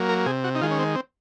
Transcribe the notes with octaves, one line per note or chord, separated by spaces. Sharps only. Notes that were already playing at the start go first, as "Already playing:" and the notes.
Already playing: F#3 A#3
A#4
C3 G#4
F#4
D#4
D#3 G#3 F4
C#4
C4
C4